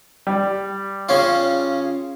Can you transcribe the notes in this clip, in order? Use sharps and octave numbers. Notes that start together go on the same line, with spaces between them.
G3
C#3 C#4 F4